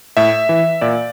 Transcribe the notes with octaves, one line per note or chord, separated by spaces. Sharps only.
A2 E5
E3
A#2 D5